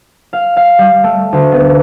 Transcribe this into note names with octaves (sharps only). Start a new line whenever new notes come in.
F5
F5
G3
A3
D2
B3